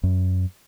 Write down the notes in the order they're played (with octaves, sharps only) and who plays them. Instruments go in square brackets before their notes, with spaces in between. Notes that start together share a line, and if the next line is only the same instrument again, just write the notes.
[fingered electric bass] F#2